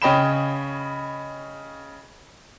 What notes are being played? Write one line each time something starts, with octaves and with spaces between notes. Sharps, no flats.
C#3 C#5 D#5 G5 B5 E7